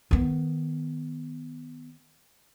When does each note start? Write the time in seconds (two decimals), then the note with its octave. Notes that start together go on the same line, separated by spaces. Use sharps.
0.11 D#3 B3